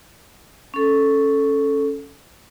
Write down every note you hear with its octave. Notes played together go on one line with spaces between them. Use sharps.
C#4 A4